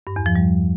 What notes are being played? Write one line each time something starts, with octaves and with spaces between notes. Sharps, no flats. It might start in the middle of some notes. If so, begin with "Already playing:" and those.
G2
E2
F3
G3